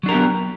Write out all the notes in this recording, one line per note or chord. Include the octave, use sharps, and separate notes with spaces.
F#3 B3 D4 G4 A#4